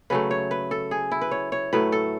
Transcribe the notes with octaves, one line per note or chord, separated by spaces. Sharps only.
C#3 F#3 A3 B4
C#5
B4
A4
G#4
E4
B4
C#5
C#5
A2 F#3 A3 B4
A4